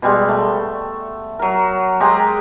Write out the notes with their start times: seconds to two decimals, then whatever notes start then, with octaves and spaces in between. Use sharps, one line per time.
0.02 B2 G3 G#3
0.29 A3
1.39 F#3 A#4
2.00 G#3 G4 G#4 A#5